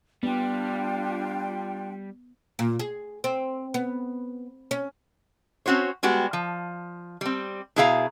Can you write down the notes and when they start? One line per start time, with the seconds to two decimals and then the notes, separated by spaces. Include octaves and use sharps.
0.23 G3 B3 D4 F4 G5
2.59 A#2
2.79 G#4
3.24 C4
3.74 B3
4.71 C#4
5.66 C4 C#4 F#4 C5 C#5
6.03 G3 G#3 B3 F#4 G4
6.33 F3
7.21 G3 C4
7.76 B2 E4 G#4 E5 F5 A#5